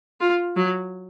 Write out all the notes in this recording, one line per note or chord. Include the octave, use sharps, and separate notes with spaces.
F4
F#3